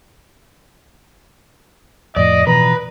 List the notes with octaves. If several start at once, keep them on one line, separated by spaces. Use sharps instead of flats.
F2 A2 F3 D5 D#5
B2 E3 F3 B4 A#5